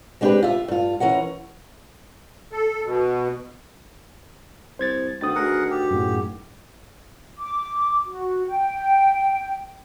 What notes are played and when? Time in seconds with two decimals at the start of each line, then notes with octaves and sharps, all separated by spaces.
0.21 G#3 C4 D4 F#4 G4 B4
0.43 F4 E5
0.68 G2 F4
1.00 E3 C#4 A#4 F#5
2.52 A4
2.86 B2
4.79 C2 C5 G#6 A6
5.21 D2 B2 D#3 D#6 A6
5.35 D2 G#4 A#4 F#5
5.71 G4
5.91 F#2 A2 G#4 F#5
7.39 D6
8.05 F#4
8.48 G5